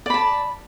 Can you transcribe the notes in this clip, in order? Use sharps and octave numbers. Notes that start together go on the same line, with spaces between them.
D5 A5 B5